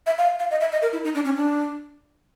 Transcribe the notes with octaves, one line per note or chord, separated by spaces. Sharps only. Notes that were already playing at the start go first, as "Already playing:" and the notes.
E5
F5
F5
D#5
E5
D#5
A#4
E4
D#4
D4
C#4
D4